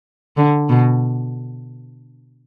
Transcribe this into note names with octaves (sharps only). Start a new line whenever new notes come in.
D3
B2